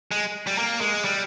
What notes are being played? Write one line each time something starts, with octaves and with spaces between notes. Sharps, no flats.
G#3
G3
A#3
G#3
G3